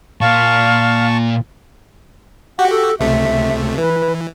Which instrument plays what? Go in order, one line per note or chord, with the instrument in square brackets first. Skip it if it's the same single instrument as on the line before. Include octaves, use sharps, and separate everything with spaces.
[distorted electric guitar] A#2 [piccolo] F5 [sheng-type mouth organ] A5 C#6
[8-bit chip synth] F#4 G4 [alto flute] F#5
[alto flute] A4
[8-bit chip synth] C#2 C3 A3 [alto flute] E5
[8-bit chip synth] E3 [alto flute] B4